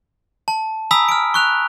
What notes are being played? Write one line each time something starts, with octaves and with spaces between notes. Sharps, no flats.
A5
G#5 A#5 B5 D#6 E6 B6
F6 D7
C#6 F#6 F7